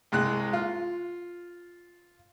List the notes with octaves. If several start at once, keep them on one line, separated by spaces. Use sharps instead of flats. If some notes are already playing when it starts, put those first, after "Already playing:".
C2 G#3 F#6
F4